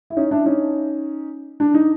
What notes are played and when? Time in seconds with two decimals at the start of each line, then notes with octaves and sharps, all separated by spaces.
0.10 E4
0.16 C#4 D#4
0.31 D4 E4
0.45 C#4 D#4
1.60 D4
1.74 D#4